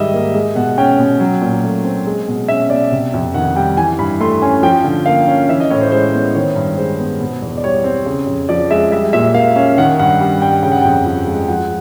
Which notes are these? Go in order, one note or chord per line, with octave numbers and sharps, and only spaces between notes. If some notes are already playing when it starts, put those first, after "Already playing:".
Already playing: G#2 D#3 G3 D#5 E5
A#3
G#3
B2 F#5
C#4 G5
B2
F#3
A#2
A3
C4
G#3
B2
C#4 E5
B2 D5
C3
F2
D#3 F#5
G3 G5
E3 G#5
G2 B5
A3 C6
C#4 G#5
F3 G5
D3
A#3 F5
C#4
E3 E5
D#5
A2 C#5
C5
G#3 C5
B3
D#3 C#5
G2
G#3 C5
B3
B2
E2
D5
G3 C#5
C4
C#3
F2
F3 D5
G#3 E5
G3 E5
A#2 E5
A#3 F5
C#4
D#3 F#5
G2 F#5
G3
G2 G5
C#3 G5
F#5
F2 G5
F3
G#3
F3 F#5